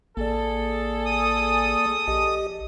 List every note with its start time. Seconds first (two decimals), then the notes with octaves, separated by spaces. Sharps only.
0.17 A1 A#3 G#4 A4 D5
1.06 D#6
2.08 A#1 G4 D#5